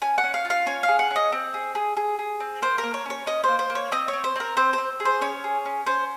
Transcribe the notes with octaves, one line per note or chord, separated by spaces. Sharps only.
C#4 G#5
F#5
C#4
F5
F4
F5
C#4 C#5
F5
G#4
F#5
C#4
D#5
C4
G#4
G#4
G#4
G#4
C4
A#3 C5
A#4
A#3
C#5
C#4 C#5
C#4 D#5
A#3 C5
C5
A#3
C#5
C4 D#5
C#5
C4
C5
C4 A#4
C4 C5
C4 C5
G#4
C5
C#4 C#5
G#4
C#4
C#4 C5